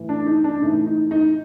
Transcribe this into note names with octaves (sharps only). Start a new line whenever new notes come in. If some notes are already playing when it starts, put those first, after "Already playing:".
Already playing: A2 E3
D4
D#4
D4
A2 E3 D#4
D#4
D#4